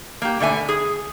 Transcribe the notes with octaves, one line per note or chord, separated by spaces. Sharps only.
A#3 G4
B2 D3 A3 E5 G#5
G#4